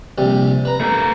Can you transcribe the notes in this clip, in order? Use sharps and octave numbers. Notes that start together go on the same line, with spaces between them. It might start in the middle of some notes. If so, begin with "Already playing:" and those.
A#1 C3 G3
B4 A#5
A3 A#4